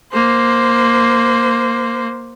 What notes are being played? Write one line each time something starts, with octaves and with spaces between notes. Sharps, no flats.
A#3 C5